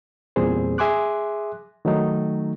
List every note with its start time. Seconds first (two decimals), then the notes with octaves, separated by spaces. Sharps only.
0.36 E2 A#2 G3 C4 G#4 C5
0.78 G#4 E5 G#5 C6 D6 F#6
1.85 D#3 F#3 A3 D#4